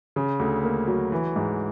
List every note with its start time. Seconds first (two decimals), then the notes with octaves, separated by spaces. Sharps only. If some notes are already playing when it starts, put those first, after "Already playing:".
0.16 C#3
0.39 D2
0.64 A#3
0.87 F#3
1.12 E3
1.36 G#2